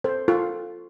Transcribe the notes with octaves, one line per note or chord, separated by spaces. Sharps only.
C4 A4 C5
F4 A4